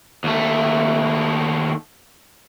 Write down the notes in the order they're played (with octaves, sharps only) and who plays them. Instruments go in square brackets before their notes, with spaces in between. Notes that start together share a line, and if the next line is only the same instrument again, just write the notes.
[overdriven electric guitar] D#2 A3